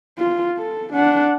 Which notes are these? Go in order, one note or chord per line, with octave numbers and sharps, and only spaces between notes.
F4
A4
D4 F#5